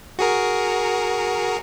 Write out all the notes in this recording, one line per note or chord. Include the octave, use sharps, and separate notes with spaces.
F#4 G#4 A#4